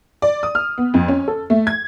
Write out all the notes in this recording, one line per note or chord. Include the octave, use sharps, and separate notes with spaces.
D5
D#6
F6
B3
F2
C#4
A4
A3
G#6